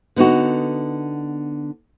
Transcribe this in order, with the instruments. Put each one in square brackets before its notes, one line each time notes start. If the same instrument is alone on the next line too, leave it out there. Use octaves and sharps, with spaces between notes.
[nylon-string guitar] D3 B3 D#4 F#4